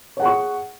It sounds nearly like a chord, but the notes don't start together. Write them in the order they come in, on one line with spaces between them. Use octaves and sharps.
C#5 F#5 G#4 C#6